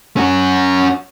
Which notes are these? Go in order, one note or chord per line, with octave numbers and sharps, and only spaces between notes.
C#4 F#4